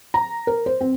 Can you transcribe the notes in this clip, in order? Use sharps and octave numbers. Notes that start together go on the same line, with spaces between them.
A#5
A#4
C5
C4